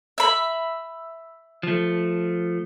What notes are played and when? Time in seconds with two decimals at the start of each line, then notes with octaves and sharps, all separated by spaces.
0.18 E5 B5
1.63 F3 A3